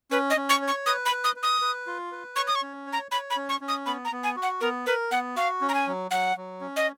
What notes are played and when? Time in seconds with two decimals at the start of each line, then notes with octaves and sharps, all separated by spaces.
0.11 C#4 B4
0.30 D#5
0.37 C#4
0.49 C#6
0.62 C#5
0.68 C#6
0.86 B4 D#6
1.06 B5
1.12 B4
1.24 D#6
1.36 B4
1.43 D#6
1.61 B4
1.87 F4
2.12 B4
2.36 C#5 C#6
2.47 D#6
2.55 C#6
2.62 C#4
2.87 C#5
2.93 A#5
3.12 C#5 B5
3.30 B5
3.36 C#4
3.49 C#6
3.61 C#4
3.68 D#6
3.86 B3 B5
4.05 A#5
4.12 B3
4.24 G#5
4.36 F#4
4.42 F#5
4.61 B3 A#4
4.86 A#4 B4
5.11 B3 F#5
5.36 F#4 F5
5.61 C#4
5.69 A#5
5.74 G#5
5.87 F#3
6.11 F#3 F#5
6.36 F#3
6.61 C#4
6.76 D#5